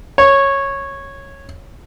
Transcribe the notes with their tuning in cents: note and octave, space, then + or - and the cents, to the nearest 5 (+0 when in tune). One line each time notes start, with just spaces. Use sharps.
C#5 -10